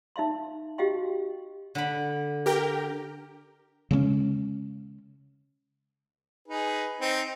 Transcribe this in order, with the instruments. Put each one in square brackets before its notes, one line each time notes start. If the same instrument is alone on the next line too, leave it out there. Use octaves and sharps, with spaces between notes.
[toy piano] D#4 E5 F5 C6
F#4 G4 D#5 F5 G5 C6
[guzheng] D3 B5
[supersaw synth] G4 A#4 G5
[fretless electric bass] C#3 G#3 A3 C#4
[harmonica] D#4 G#4 B4
C4 D#4